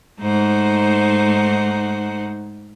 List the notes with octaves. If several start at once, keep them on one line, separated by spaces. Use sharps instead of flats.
G#2 A3 D#4 C5 F#5